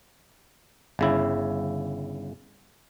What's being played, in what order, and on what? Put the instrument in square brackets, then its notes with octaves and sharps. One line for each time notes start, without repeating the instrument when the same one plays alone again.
[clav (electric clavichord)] G1 C#3 E4